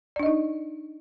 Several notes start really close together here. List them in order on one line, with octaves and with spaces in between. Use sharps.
D5 D4 D#5 D#4